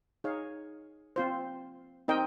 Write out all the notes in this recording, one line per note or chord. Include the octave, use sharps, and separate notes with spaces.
D#4 G#4 C#5 F5
C4 F4 C5
C4 D#4 A#4 D#5 G5